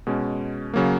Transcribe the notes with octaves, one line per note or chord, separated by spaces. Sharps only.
B2 G#3 C#4
C#3 F#3 A#3